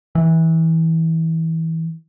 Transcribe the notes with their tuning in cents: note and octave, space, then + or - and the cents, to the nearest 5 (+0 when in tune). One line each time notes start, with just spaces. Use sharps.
E3 -25